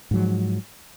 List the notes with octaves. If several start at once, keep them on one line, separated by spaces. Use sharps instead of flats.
G#2 F3 F#3